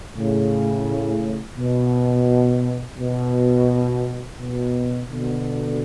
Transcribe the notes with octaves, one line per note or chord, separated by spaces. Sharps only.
A2 C#3
B2
B2
B2
B2 D3